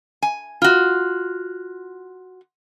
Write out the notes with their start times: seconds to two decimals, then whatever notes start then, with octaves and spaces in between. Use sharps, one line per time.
0.22 G#5
0.62 F4 F#4